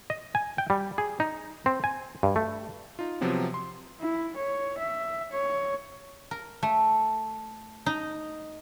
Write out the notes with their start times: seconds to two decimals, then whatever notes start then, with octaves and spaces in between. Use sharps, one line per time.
0.10 D#5
0.35 G#5
0.58 G5
0.70 G3
0.98 G#4
1.20 D#4
1.66 C4
1.84 G#5
2.23 G2
2.36 A3
2.99 D#4 F4
3.21 C3 F3 F#3 B3 C4
3.54 C6
4.01 E4
4.36 C#5
4.78 E5
5.32 C#5
6.31 A#4
6.63 A3
7.86 D#4